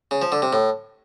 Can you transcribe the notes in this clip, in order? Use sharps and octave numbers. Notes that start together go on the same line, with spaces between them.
C#3
F3
D3
C3
A2